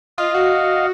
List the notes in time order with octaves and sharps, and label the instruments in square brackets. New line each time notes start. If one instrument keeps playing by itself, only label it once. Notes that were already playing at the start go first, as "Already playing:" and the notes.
[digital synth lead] F4 [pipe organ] D#5 F5
[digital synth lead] F#4